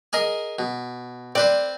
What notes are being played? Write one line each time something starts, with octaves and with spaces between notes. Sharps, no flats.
G#4 A#4 D#5
B2
C4 B4 C5 D5